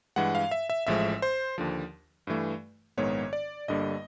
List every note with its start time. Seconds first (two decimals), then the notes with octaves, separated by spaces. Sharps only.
0.16 G2 E3 G#3 F#5
0.35 F5
0.51 E5
0.70 E5
0.87 A1 A2 F3 G#3 E5
1.22 C5
1.58 D#2 D3 F3
2.27 G2 E3 A3
2.97 A#1 G#2 D#3 G#3 B3 C#5
3.33 D5
3.68 G1 G2 D3 G3 A#3 D#5